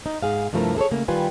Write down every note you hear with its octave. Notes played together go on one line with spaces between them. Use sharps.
D#4
G#2 G#4 F5
G2 C3 F3 A3 E4 A#4
G#4 A4 B4 C#5
C#3 A3 A#3
D#3 G3 F4 B4 G#5